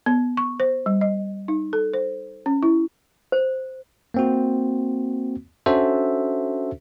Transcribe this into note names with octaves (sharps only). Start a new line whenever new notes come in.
B3
C#6
C5
G3
D#5
D#4
A4
C5
C#4
E4
C5
A#3 C4 F#4
C#4 D4 F#4 A4 C5 E5